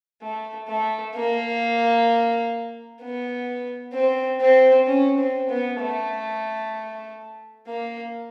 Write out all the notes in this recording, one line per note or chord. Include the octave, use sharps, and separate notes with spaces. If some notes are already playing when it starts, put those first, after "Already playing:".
A3
A3
A#3
B3
C4
C4
C#4
C4
B3
A3
A#3